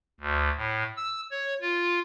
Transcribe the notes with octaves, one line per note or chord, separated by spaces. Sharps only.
D2
A2
E6
C#5
F4